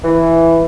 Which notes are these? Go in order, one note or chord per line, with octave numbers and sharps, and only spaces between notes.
E3